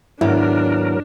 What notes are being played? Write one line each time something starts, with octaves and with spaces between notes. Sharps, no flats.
D#2 G#2 F#3 B3 D4 E4 A#4